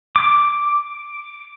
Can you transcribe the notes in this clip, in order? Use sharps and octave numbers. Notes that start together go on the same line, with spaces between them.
D6